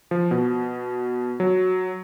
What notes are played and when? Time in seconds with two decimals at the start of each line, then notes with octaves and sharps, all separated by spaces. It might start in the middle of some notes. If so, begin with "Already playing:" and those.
0.11 F3
0.31 B2
1.40 F#3